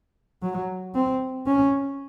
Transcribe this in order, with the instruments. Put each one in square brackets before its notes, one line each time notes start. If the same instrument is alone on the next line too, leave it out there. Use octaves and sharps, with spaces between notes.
[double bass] F#3
C4
C#4